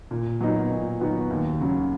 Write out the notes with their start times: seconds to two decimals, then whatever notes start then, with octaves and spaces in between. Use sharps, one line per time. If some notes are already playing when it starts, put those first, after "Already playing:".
0.11 A#2
0.41 F#3 B3 D#4 F#4
0.71 A#2
1.01 F#3 B3 D#4 F#4
1.30 D#2
1.60 C#3 F#3